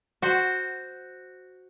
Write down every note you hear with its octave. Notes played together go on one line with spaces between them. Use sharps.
F#4 C5 F#5